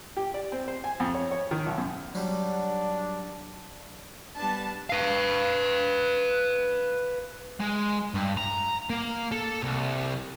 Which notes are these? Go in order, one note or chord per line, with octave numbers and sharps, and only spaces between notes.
G4
D5
C4
C5
G#5
F2
C#5
C#5
D#3
B1
F#2
F#3 G3 D4
G3 B3 D4 A5
B4 F5
G#3
G2
A#5
A#3
A4
C2